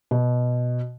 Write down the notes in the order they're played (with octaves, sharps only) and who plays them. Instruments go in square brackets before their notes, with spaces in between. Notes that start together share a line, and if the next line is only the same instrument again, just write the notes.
[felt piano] B2